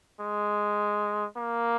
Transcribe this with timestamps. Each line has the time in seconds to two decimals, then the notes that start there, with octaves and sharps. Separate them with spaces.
0.21 G#3
1.37 A#3